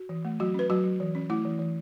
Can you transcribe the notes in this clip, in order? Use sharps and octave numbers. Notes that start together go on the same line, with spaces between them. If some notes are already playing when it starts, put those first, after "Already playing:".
Already playing: F#4
E3
A3
F#3 F#4
C#4 B4
F#3 F#4
F#3
E3
C#4
A3 E4
E3
E3